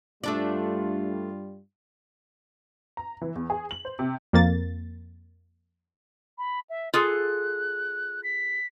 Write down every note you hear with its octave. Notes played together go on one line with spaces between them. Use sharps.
G2 G3 A3 D4 F4 D5
A#5
E3
E2
G#4
F#7
C5
C3
F2 A#3 A6
B5
E5
F4 G#4 A4 F#6
B6